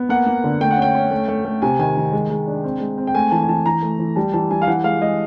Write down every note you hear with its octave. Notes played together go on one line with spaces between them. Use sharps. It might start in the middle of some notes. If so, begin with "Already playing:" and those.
Already playing: B3
A#3 F#5
A#3
D3
A3 G5
F#5
C#4 G5
C#4
A3
A3
A3
C3 G#5
D#3 G#5
D#3
G#3
G#3
D4
C4
G#3
C4
G5
A3 G#5
E3 A5
G#5
E3 A5
E3 A#5
A3
E3
G3 A5
E3 A5
G3 G#5
F5
E3 F#5
G#3 F5
G#3 D#5